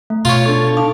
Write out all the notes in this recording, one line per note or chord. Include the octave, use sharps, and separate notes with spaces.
A3
B2 F4 C#5
D4 A4 C#6
D#4 F5 A5 D6